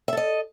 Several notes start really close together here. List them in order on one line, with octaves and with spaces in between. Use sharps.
E5 A4 D#5